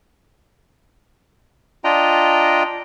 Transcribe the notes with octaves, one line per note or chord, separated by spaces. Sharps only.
D4 F4 D#5 G5 A#5